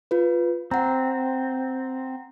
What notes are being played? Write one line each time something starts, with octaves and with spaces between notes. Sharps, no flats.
F4 B4
C4 F#5 A#5